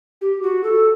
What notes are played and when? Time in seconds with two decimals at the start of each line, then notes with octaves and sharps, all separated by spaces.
0.21 G4
0.42 F#4
0.64 A4